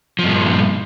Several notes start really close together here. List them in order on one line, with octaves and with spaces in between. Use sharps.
F3 G2 A#2